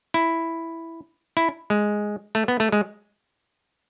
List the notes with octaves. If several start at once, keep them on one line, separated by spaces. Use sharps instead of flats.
E4
E4
G#3
A3
B3
A3
G#3